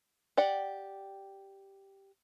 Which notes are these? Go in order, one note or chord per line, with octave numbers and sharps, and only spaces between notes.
G4 D5 F#5